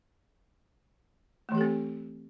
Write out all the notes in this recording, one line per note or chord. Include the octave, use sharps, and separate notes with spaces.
E3 A3 C4 G4 A4